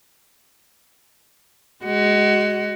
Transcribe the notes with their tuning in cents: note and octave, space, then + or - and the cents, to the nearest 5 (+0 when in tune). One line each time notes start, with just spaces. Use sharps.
G#3 +0 F#4 +20